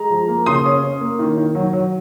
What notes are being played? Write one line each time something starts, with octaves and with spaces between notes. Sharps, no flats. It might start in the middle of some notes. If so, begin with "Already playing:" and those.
Already playing: G#3 A#5
F3
A#3
C#3 C6 D#6
C#4
C#4
A#3
D#3
D#3
F#3
F#3